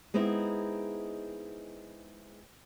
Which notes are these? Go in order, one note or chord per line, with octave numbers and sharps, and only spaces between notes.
G#3 B3 C4 D#4 E4